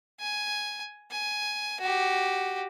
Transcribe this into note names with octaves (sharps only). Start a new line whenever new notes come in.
G#5
G#5
F#4 G4